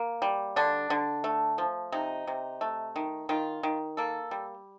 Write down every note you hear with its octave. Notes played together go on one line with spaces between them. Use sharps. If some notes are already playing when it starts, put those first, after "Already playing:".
Already playing: A#3
G3
D3 D4
D3
A3
F3
C3 D#4
C3
A3
D#3
D#3 F4
D#3
A#3 A4
G3